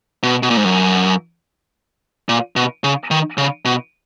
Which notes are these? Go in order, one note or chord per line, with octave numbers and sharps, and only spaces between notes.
B2
B2
A#2
G#2
F#2
A#2
B2
C#3
D#3
C#3
B2